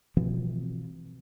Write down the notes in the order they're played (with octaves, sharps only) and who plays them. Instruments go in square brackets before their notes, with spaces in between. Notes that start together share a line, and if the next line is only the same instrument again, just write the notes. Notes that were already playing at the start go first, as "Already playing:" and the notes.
[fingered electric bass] B2 E3 F3 C4